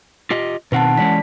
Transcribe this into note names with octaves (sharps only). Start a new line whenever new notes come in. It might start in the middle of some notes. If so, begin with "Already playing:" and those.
F4 G4 D#5
B2 D#3 C4 B4 F#5 A5
E3 G#3 C#4 D5 B6